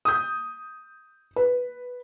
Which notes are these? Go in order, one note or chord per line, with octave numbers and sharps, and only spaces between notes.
D#6 G6
B4